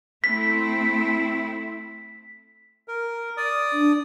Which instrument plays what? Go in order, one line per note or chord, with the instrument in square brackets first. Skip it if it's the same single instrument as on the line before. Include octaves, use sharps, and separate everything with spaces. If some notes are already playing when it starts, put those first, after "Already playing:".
[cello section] A3 C4 E4 [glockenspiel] B6
[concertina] A#4
D5 D#6
[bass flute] D4